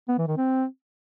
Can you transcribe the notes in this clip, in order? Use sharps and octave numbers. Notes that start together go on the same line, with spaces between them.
B3
E3
D#3
C4